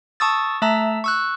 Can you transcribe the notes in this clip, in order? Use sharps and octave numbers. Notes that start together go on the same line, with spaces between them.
A5 C#6 D#6 E6 A6
A3 E5 A5 A#5 E6
C#6 E6 F#6